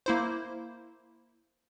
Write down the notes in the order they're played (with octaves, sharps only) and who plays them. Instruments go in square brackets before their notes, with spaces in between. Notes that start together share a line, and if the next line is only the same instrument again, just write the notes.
[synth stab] A#3 E4 C5